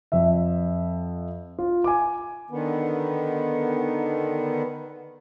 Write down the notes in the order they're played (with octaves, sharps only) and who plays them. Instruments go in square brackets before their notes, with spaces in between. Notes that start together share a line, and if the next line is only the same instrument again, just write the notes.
[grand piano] F2 E5
F4
G#5 D6
[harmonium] D3 D#3 B3